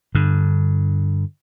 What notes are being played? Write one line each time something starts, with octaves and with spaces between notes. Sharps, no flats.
G2 D3